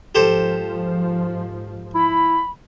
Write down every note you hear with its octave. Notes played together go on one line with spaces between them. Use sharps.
G#2 F3 G4 A4 C5
E4 B5